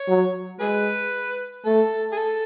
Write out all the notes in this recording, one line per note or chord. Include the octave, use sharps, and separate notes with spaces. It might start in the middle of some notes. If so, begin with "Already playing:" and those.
Already playing: C#5
F#3
G#3 G#4 B4
A3 A4
G#4
A4